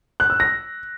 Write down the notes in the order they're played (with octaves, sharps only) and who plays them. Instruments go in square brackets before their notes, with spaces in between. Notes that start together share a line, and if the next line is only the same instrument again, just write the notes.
[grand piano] F#6
E6
A#6